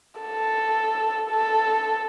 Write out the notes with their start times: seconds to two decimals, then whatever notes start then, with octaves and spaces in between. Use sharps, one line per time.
0.21 A4
1.30 A4